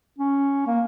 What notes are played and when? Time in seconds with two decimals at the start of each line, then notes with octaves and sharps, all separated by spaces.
0.18 C#4
0.67 A#3